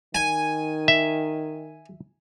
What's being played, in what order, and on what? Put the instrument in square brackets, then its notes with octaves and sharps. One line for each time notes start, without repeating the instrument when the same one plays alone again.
[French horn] D#3 [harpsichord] G#5
[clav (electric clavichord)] E5